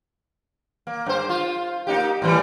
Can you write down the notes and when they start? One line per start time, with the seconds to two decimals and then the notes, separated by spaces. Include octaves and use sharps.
0.87 A#3
1.06 G2 C5
1.29 F4
1.87 A#3 D#4 G4
2.22 A2 E3 G3